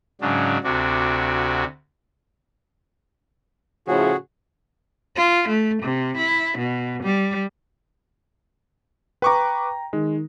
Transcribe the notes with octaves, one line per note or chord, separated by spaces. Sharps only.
G#2 C#3 F#3 D4
D2 C3 D4 F#4
A2 C#3 F3 F#4 G#4
F4
A3
C3
E4
B2
G3
B4 G5 A#5 C#6 D6
D#3 G#3